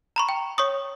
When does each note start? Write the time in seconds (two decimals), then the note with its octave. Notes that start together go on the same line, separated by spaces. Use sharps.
0.16 A#5 B5 C#6
0.29 G5
0.58 C#5 C#6 D#6